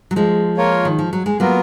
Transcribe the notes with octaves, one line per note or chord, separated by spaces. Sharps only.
F#3
F3 G#3
A#3 F4 A#4 C#5
D#3
F3
F#3
G#3
F#3 A#3 B3 F4 A#4